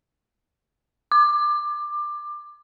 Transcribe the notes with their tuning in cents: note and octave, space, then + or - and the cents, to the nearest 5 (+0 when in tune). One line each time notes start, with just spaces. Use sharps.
D6 +20